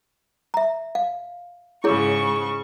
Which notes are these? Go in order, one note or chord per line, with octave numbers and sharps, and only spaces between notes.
E5 A#5
F5
G#2 C#3 E4 G#4 C#5 C#6